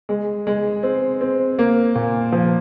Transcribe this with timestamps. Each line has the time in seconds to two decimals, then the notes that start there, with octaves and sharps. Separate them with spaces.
0.09 G#3
0.47 G#3
0.83 C4
1.21 C4
1.59 A#3
1.96 A#2
2.32 F3